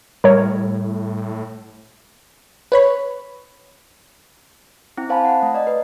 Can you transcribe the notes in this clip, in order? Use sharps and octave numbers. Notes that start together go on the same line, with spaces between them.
A2 G3 A#4 C#5
B4 C#5 B5
C4 E4 G5
C4 C5 F5 G#5 A5 B5
F#5
A3
D5 D#5
B4